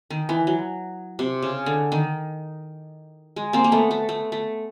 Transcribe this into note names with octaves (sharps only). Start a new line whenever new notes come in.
D#3
E3
F#3
C3
C#3
D3
D#3
G#3
A#3 C4
A#3
A3 B3
A3
A3
A3